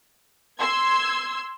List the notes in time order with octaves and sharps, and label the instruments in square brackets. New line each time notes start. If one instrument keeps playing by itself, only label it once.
[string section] C6 E6 G#6